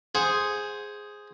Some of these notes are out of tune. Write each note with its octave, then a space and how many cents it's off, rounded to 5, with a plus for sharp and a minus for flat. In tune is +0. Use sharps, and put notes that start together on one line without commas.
G#4 +0 C5 +0 F#5 -15